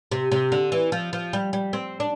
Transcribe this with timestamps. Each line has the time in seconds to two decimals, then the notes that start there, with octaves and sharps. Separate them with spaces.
0.12 C3
0.32 C3
0.52 D3
0.72 E3
0.92 F3
1.13 F3
1.33 G3
1.53 G3
1.73 C4
2.00 D4